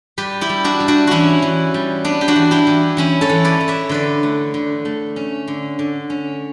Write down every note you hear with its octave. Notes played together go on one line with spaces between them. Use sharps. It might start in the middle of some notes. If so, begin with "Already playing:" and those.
G3 G4 B4
E4 G4
G3
D4 F#4
G3
D4 F#4
E3 C#4 E4 F#4
E3
G3
B3 D4
G4
D4 F#4
E3
E4 G4
E3
E3 C#4 E4
A4 C#5
E3
B4 D5
E3
C#5 E5
D3 B4 D5
A3
D3
A3
C#4
D3
D3
C#4